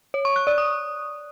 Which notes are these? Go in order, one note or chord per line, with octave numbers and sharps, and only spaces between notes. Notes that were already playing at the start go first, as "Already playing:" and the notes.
C#5
C#6
F#6
D5
D#6